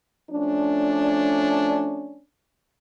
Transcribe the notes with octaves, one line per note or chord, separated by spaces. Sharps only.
F3 A3 C#4 D4